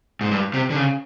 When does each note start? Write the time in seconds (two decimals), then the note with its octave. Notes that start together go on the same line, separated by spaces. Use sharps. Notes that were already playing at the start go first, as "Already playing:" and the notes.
0.21 G#2
0.31 G2
0.54 C3
0.70 D3
0.76 C#3